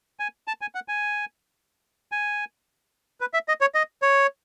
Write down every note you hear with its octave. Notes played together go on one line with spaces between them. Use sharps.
G#5
A5
G#5
F#5
G#5
G#5
B4
E5
D#5
C#5
D#5
C#5